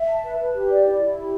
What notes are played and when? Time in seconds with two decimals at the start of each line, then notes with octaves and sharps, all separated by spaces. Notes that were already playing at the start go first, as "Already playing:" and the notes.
Already playing: E5
0.09 A5
0.23 B4
0.39 B4
0.55 G4
0.70 D5
0.86 E4
1.01 E4
1.16 G4